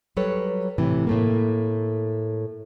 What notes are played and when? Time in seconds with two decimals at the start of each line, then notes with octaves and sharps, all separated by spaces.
0.17 F#3 G3 A4 B4 C#5
0.78 A2 C3 E3
1.07 A2 A3 A#3